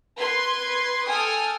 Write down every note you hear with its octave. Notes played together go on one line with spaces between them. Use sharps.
B4 C6 G#6
A4 G5 G#5 D#6 F6